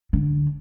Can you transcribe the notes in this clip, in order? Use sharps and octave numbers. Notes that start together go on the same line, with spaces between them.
D3